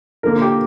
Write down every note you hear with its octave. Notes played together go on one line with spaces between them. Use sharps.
D3 F3 A#3 A#4
G4